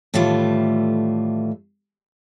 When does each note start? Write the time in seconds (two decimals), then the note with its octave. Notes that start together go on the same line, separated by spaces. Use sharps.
0.14 A2 D#3 E3 G3 A3 F4